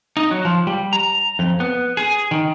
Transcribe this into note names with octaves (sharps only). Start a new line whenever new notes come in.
D#4
F#3
F3
G3
A#5
F2
B3
G#4
D#3